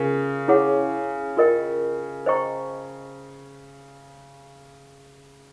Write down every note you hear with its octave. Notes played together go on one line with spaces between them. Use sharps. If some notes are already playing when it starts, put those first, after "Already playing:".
Already playing: C#3 C#4 F4 A#4
C#4 E4 G#4 C#5 F#5
F4 A#4 D#5 G5
C5 D#5 G5 A#5 C#6